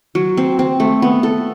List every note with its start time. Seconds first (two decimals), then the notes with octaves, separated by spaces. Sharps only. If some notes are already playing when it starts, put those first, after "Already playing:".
0.15 F#3
0.37 C4
0.59 C4
0.80 A3
1.02 B3
1.23 A4